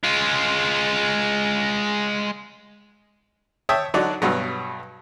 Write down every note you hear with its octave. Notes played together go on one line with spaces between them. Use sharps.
G#3 F4
C#5 E5 G5 A5 D#6
D3 F#3 D4 D#4 D5
G2 B2 F#3